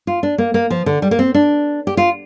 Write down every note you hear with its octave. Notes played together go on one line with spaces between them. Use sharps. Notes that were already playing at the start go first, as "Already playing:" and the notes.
F4
D4
A#3
A#3
F3
D3
G3
A#3
C4
D4
G4
F4